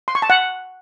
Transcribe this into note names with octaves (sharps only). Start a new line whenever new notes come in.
C6
C#6
A5
F#5